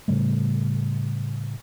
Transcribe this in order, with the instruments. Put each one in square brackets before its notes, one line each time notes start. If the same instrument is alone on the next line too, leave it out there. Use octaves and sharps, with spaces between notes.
[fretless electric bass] A2 C#3 G3 A3